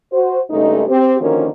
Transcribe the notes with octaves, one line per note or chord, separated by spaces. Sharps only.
F#4 C5
G2 C#3 G#3 A3 D#4
C4 G4
D3 D#3 F3 A#3 C#4 F#4